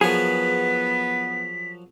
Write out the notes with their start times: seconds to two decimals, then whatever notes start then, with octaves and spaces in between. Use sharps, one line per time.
0.01 F3 F#3 B3 G#4 A#4 B6